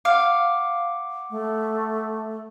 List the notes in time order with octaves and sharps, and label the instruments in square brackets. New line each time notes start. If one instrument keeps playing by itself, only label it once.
[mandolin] F5 [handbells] F#5 D6
[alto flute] A3